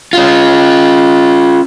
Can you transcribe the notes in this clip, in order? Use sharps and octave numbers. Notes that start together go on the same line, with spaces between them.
C#4 F4